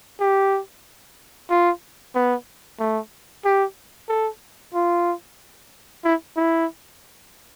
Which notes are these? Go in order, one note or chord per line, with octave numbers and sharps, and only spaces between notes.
G4
F4
B3
A3
G4
A4
F4
E4
E4